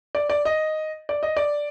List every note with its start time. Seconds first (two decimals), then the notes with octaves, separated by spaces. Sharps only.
0.15 D5
0.30 D5
0.45 D#5
1.09 D5
1.23 D#5
1.37 D5